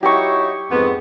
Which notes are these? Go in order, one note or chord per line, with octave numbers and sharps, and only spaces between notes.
F#3 D#4 E4 G4 C#6
F2 G#2 B3